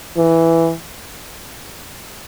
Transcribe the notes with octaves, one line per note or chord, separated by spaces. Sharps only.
E3